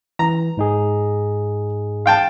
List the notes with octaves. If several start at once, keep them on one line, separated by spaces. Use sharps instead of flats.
E3 A#5
G#2 D#4 G#4
F5 G5 A5